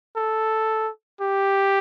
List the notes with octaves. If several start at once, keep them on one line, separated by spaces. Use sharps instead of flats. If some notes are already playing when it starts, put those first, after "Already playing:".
A4
G4